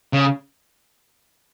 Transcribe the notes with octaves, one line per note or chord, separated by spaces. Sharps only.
C#3